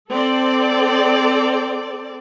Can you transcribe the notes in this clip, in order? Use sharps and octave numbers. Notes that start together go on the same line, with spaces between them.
C4 A4 D5